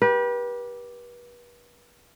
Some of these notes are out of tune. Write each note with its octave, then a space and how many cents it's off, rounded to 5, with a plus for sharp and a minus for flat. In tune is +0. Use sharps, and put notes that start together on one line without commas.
G4 +0 B4 -35